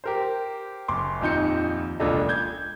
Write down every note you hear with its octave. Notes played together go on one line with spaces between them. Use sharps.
G4 A#4 C5
F#1 C6 D6
D#1 F2 D#4 G6 C#7
E1 C#2 A#2 D4 A4 D#5
G6 G#6